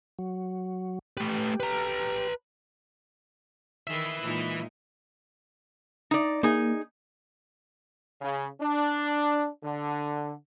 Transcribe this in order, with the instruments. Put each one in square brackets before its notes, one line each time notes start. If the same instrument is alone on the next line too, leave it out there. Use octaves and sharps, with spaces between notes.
[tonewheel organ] F#3
[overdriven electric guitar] A3 B4 [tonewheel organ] G4
[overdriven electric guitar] B4 A#5
[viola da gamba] D#3 G#4 [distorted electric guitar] E3 E5
[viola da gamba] A#2 G#3 D#4
[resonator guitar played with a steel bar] D#4 D5
[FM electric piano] A#3 [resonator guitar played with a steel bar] D#4 G#4
[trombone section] C#3
D4
D3